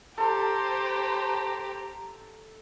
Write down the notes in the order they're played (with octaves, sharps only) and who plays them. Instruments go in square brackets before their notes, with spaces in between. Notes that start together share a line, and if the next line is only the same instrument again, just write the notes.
[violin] G4 [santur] A4 [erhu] C5 [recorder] A#5